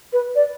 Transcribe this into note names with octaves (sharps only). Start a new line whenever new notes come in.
B4
D5